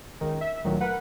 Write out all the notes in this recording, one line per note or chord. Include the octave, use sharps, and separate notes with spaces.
C#2 D#3
E5
D2 A#2 D#3 F#3
A#4 B4 F#5